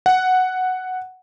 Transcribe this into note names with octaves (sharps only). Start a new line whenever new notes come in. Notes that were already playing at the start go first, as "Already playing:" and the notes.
F#5